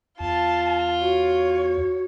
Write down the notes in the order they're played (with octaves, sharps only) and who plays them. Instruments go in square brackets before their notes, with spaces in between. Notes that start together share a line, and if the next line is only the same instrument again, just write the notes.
[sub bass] E2 [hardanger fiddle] F4 [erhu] A5
[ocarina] F#4 [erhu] C#5